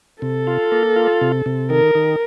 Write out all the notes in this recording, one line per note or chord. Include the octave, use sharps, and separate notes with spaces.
C3 A4
F4
A#3
F4
C3
C3
D#3 A#4
D#3